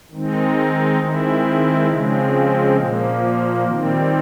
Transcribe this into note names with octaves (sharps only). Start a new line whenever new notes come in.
D#3 G#3 C4 D#4
D#3 G#3 C4 E4
C#3 F3 G#3 C4
A#2 F3 A#3
D#3 G3 C4